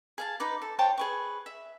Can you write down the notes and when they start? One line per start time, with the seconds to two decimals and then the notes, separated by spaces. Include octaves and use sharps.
0.18 G#4 F5 A5
0.40 D#4 B4 D6
0.62 A4
0.79 C5 C#5 G5 A5
0.98 G#4 B4 C#6
1.46 E5